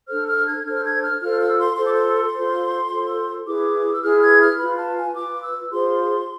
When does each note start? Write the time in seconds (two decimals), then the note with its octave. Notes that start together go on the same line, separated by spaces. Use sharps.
0.08 D4 A4 C5 F6
0.27 F6
0.46 G#6
0.64 D4 A4 C5 F6
0.84 G#6
1.02 F6
1.21 F4 A4 C5 F6
1.40 E6
1.59 C6
1.77 F4 A4 C5 C6
1.85 D6
1.93 C6
2.34 F4 A4 C5
2.90 F4 A4 C5
3.46 E4 G#4 B4 D6
3.94 E6
4.02 E4 G#4 B4 F6
4.22 G#6
4.40 F6
4.58 F4 B4 B5
4.78 A5
4.96 G#5
5.15 F4 B4 D6
5.43 E6
5.71 F4 G#4 C5 C6